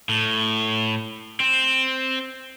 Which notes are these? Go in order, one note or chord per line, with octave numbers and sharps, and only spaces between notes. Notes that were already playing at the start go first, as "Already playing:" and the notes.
A2
C4